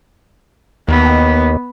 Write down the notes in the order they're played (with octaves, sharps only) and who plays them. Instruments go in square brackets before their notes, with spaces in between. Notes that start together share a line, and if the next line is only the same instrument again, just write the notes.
[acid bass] D#2 [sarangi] B3